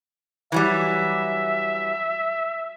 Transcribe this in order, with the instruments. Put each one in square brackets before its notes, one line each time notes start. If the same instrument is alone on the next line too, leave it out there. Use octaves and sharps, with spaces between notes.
[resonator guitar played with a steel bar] E3 F#3 G3 [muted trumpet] E5